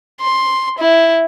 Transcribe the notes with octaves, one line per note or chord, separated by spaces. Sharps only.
C6
E4